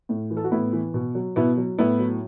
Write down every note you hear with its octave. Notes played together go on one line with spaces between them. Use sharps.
A2
E3
A4
F#4
A2 B3 E4
E3
B2
F#3
B2 B3 E4
F#3
A2 B3 E4
F#3